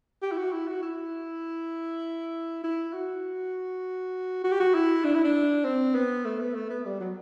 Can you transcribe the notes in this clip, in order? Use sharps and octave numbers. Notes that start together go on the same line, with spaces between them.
G4
E4
F#4
E4
F#4
E4
E4
F#4
F#4
G4
F#4
E4
D4
E4
D4
C4
B3
A3
B3
A3
B3
G3
F#3